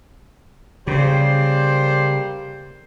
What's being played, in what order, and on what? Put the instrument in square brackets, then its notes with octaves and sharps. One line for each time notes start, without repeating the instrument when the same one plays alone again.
[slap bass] C#3 [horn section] G3 A#3 C5